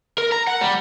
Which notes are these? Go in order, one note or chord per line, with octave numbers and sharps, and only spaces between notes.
A#4
A#5
F#5
G3